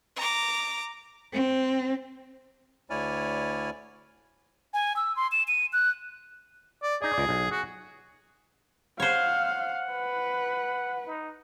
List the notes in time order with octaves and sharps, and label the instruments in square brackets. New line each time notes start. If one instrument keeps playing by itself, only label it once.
[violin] A#5 D6
[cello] C4
[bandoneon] D2 E4 C#5 D5 G#5 F6
[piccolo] G#5
E6
C6
E7
D#7
F#6
[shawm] D5
[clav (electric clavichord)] D#4 D5 [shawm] G#4
[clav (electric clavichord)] C#2 D5
B1
[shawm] F#4 [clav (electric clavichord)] G#4
[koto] C5 C#5 [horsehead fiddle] F5 [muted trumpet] F#5
[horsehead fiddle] B4
[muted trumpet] D#4